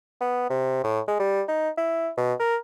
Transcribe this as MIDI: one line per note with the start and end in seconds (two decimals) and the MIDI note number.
0.21 0.48 59
0.50 0.83 48
0.84 1.00 45
1.08 1.19 56
1.20 1.42 55
1.48 1.70 63
1.78 2.10 64
2.18 2.34 47
2.40 2.56 70